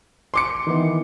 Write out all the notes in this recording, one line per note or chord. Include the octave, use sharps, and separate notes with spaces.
C6 D6 C#7
D#3 E3 B3